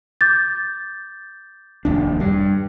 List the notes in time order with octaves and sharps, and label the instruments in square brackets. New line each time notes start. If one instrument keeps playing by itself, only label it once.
[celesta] D6 G6 A6
[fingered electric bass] F1 D#2 D4
G2